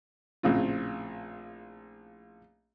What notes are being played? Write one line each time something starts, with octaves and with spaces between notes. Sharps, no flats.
A#1 A2 C#3 C4 F4